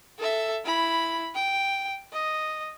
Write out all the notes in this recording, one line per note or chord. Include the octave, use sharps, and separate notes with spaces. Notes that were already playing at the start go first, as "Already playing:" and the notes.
A4 E5
E4 B5
G5
D#5